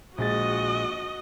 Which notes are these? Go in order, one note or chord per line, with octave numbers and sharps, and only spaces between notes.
A#1 G#3 F#4 D#5 A6